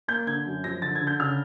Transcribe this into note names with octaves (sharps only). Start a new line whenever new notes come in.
A#3 G6
D3 G#6
F#2
F3 A#6
D3 A6
G#6
D3
G6
C#3 F6